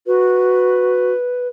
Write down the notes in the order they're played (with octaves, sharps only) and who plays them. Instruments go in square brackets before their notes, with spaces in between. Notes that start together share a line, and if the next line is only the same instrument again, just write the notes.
[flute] F#4 [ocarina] B4